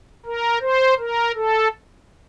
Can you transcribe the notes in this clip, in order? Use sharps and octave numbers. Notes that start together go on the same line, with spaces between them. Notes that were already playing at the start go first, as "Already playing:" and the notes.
A#4
C5
A#4
A4